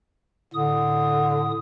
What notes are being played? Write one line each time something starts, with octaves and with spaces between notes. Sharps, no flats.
A2 D3 D#6